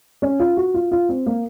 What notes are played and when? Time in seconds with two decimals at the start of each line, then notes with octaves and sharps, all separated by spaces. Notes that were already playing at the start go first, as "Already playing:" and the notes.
0.22 C#4
0.40 F4
0.57 F#4
0.74 F4
0.91 F4
1.09 C4
1.26 A#3